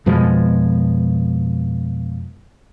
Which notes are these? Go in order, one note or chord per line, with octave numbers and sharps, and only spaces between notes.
F2 B2 F3 G#3